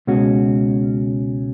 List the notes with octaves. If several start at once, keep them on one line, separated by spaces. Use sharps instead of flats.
C#2 B2 G#3 C#4 F#4